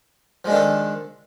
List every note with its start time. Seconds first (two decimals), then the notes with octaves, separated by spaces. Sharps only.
0.45 F3
0.47 G#3
0.50 D4
0.52 D#3
0.55 A4